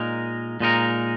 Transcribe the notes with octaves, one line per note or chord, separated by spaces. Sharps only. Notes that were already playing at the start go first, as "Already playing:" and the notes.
Already playing: A#2 G#3 D#4 A#4
A#2 G#3 D#4 A#4